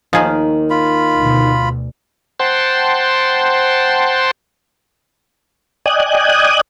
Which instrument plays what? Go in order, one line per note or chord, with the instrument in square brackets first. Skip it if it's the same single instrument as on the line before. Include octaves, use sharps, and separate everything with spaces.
[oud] D#2 D#3 D#4 [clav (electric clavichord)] F3 G#4
[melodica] F4 B5
[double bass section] D2 B2
[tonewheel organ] C5 F#5 G5 A5 C6
D5 D#5 G5 G#5 D#6 F#6